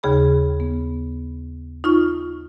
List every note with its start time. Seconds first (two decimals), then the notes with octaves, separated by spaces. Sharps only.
0.03 D#2 C#3 G#4 B5
0.60 B3
1.84 D#4 F4 C#6